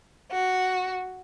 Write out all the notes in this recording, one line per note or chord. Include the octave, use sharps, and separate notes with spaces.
F#4